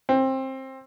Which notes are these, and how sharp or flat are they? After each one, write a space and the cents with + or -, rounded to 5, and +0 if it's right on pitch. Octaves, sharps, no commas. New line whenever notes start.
C4 +20